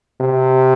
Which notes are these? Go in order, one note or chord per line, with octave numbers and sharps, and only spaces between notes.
C3